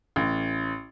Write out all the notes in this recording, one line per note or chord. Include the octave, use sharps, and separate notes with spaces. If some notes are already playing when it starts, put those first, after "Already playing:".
A1